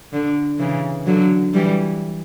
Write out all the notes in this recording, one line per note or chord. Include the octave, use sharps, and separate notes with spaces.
D3
C#3 E3
D3 F#3
E3 G3